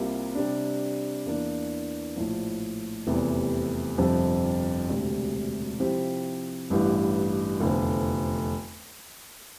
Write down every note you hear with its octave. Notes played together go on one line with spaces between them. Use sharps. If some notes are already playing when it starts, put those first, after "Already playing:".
Already playing: C2 C3 G3 A#3 F4
C3 G3 D4
E2 E3 A#3 D4
A#1 A2 F3
F1 E2 C3 G3
G1 F2 C3 F3 C4
E1 D2 C3 G3
C3 F3 C4 E4 G4
A1 G2 E3 G3
F1 E2 D3 F3